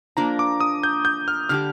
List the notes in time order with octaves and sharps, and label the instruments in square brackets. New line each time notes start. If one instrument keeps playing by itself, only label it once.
[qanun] F3 A#3 D4 [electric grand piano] A#5
[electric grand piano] D6
D#6
G6
G6
F6
[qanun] D3 G3 D4 G4 [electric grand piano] F6